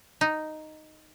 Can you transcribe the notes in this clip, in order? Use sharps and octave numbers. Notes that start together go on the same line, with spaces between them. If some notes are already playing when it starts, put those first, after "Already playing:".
D#4